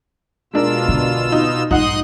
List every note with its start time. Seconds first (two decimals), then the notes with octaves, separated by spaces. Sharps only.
0.54 B2 G#3 D4 F4 A#4 E6
0.88 D3
1.32 D#4
1.71 A#1 G2 D#4 F#5 C6 D#6 F#6